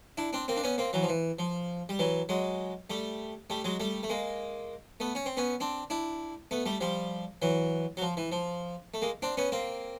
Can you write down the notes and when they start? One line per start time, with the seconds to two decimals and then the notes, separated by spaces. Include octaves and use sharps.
0.17 D4 E4
0.33 C4 D4
0.48 A#3 C4
0.57 D4
0.63 B3 C#4
0.78 A#3 C4
0.93 E3 F#3
1.03 F3
1.09 E3
1.39 F3
1.89 G3
1.99 E3 F#3
2.29 F#3 G#3
2.90 G3 A3
3.50 G3 A3
3.64 F#3 G#3
3.80 G3 A3
4.03 A3
4.09 G#3 A#3
5.00 A3 B3
5.15 C#4
5.26 C4
5.37 B3 C#4
5.60 C4 D4
5.90 D4 E4
6.51 A3 B3
6.66 G3 A3
6.81 F3 G3
7.42 E3 F#3
7.97 F#3
8.02 F3
8.17 E3
8.32 F3
8.94 A3
9.02 G#3 A#3
9.22 C4 D4
9.37 B3 C#4
9.52 A#3 C4